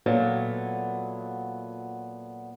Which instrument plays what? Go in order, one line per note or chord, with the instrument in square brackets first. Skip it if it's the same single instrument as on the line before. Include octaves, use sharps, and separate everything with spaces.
[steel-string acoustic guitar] A#2 F#3 A3 B3